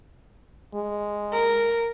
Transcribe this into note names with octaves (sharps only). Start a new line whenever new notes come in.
G#3
A#4